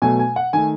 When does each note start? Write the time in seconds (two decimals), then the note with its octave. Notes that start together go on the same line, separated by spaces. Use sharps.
0.02 B2 F#3 A3 G#5
0.19 G#5
0.36 F#5
0.53 D#3 A3 G#5